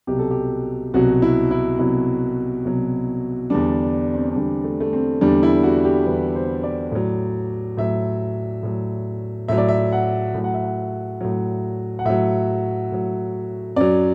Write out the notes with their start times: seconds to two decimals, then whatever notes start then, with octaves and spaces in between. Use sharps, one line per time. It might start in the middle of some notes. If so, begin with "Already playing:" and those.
0.07 C2 B2 F#3 G4
0.19 A4
0.31 G4
0.94 C2 B2 F#3 F#4
1.22 E4
1.51 E4
1.79 C2 B2 F#3 E4
2.65 C2 B2 F#3
3.50 E2 D3 G3 D4
4.14 C4
4.30 D4
4.36 E2 D3 G3 C4
4.64 A3
4.80 A3
4.93 C4
5.21 E2 D3 G3 D4
5.43 E4
5.63 F#4
5.85 G4
6.06 E2 D3 G3 B4
6.35 C5
6.63 D5
6.92 A2 F#3
7.77 A2 F#3 E5
8.63 A2 F#3
9.48 A2 F#3 E5
9.58 D5
9.69 E5
9.92 F#5
10.34 A2 F#3
10.44 F#5
10.54 E5
10.64 F#5
11.21 A2 F#3
11.99 F#5
12.05 A2 F#3 E5
12.92 A2 F#3
13.76 F#2 F#3 D5